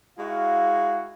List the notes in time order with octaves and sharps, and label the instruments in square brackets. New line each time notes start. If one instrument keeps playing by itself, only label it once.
[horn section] G#3 E4 F#4 [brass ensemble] F5